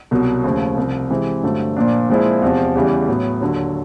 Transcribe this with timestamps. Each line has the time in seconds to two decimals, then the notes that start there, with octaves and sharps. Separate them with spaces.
0.11 C2 B2 F#3
0.44 D#2 C#3 F3 A3
0.77 C2 C3 F3
1.10 C3 E3 G#3 C4
1.43 G2 D3 F#3 A3 C4
1.77 A#2 F3 A#3 D4
2.09 A#2 F3 G#3 C4 E4
2.42 E2 C3 F3
2.75 E2 C#3 E3 G3
3.08 A2 F#3 B3
3.41 D#2 D3 F#3